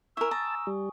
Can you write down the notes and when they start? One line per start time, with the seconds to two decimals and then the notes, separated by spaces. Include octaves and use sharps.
0.17 E4 A#4 G#5 C#6 E6
0.31 A5 A#5 D#6
0.67 G3